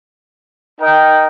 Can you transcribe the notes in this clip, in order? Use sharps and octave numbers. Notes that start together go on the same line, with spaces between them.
D#4 A#4 D#5 G5